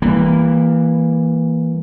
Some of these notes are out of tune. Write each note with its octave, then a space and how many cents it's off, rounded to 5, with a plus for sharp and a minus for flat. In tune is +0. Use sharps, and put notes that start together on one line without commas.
E3 +0 G3 +35 A#3 -5